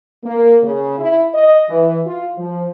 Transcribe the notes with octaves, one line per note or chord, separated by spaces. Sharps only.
A#3
C#3
E4
D#5
E3
F4
F3